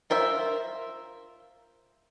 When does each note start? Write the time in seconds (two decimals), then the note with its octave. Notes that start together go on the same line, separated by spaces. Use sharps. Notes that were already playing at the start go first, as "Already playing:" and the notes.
0.10 F4 A#4 C5 E5